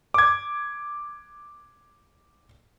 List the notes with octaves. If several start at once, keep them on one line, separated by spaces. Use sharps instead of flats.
D6 G#6